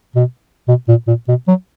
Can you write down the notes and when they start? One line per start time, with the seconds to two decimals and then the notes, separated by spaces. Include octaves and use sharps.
0.15 B2
0.68 B2
0.88 A#2
1.07 A#2
1.28 B2
1.48 F#3